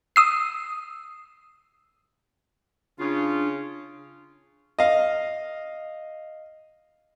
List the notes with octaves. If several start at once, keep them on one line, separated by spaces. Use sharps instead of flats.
D#6 E6 C7
C#3 D4 F4
D#5 F5